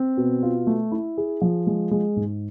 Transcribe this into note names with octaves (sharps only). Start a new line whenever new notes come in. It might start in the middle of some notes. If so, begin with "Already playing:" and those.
Already playing: C4
B2
F4
A3
E4
G#4
F3
G#3
G#3
G#2